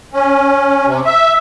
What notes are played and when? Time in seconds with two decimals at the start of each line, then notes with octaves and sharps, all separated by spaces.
0.13 C#4
0.86 C3
1.06 E5